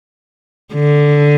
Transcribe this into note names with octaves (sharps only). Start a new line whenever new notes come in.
D3